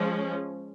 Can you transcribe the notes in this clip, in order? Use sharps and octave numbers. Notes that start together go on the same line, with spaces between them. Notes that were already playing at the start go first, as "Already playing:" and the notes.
Already playing: F3 G#3 C#4